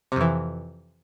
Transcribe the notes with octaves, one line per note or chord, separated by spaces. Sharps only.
F2 C3 E3